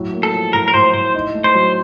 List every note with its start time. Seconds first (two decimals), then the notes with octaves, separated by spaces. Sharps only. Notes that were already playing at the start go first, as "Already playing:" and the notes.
Already playing: A2 F#3
0.13 A#3
0.23 A4
0.34 F3
0.53 A2 A#4
0.68 A#4
0.74 A2 C5
0.94 A2 C5
1.14 D#4
1.35 A3
1.44 C5
1.55 F#3